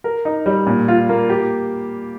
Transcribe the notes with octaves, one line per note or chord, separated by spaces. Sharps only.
A#4
D#4
G3
A#2
F4
A#3
G4